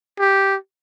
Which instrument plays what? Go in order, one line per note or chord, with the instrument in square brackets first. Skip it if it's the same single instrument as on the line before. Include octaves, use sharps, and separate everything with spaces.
[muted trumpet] G4